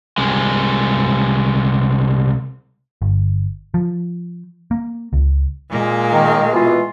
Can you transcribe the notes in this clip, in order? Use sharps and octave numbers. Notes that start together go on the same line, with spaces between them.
C2 G#3
G1
F3
A#3
C#2
A#2 G#3 A#3
D#3
B2 E3 F4